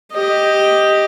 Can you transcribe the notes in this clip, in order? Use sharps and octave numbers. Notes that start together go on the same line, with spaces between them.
G4 D#5